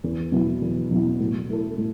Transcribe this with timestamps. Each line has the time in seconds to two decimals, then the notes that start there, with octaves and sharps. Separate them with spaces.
0.04 E2
0.32 B2 F#3 B3 E4
0.62 E2
0.91 B2 F#3 B3 E4
1.19 A2
1.50 A3 E4 A4
1.78 A2